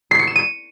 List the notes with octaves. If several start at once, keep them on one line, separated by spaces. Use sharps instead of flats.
C7
C#7
E7
D#7